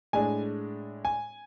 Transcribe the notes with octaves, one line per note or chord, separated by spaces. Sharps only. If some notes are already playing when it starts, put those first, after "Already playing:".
A2 G#3 D4 G#5
G#5